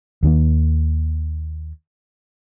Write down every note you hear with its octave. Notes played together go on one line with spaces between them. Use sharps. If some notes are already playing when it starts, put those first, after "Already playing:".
D#2 D#3 A#3